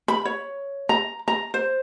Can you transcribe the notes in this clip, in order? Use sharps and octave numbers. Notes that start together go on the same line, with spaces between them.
B5
C#5
A#5
A#5
C5